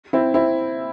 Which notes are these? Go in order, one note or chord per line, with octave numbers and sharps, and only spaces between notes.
C4 E4
C4 E4